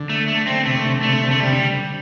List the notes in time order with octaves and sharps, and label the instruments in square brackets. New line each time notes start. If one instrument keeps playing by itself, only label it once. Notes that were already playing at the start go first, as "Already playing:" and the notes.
Already playing: [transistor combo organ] D3
[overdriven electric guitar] A3
A3
C4
[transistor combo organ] C3 [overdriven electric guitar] A3
[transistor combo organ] D3
C3
D3
[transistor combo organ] C3 [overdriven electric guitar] A3
[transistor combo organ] D3
C3
[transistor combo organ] D3 [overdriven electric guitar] A3
[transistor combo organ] C3 [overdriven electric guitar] G3
[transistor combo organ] D3